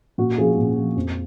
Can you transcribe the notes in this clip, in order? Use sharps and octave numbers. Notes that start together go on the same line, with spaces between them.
A#2 F#4
F3 G#4
A#2
F3
F2